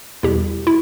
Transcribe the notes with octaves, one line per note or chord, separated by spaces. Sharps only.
E2 B2 G3 E4 G4
E4